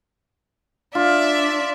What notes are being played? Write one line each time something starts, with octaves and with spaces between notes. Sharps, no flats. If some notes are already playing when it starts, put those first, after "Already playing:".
D4 F4 D5 E5